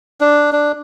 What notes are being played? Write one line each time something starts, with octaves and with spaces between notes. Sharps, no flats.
D4
D4